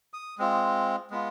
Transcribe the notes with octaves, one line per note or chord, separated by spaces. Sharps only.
D#6
G#3 C4 F4
G#3 B3 F4